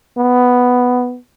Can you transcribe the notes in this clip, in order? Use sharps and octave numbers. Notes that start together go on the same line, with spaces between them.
B3